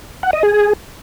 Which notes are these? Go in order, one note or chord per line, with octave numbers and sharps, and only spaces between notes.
F#5
D#5
G#4